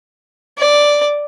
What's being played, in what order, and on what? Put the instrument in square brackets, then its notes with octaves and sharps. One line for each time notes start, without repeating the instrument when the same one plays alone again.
[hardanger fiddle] D5